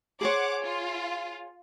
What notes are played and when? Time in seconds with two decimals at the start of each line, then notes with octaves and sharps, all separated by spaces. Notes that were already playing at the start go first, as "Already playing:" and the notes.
0.21 G#4 C5 C#5 F#5 D6
0.64 F4